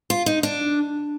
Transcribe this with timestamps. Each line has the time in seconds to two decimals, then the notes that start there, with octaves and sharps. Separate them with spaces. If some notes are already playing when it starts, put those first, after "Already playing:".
0.10 F4
0.26 D#4
0.43 D4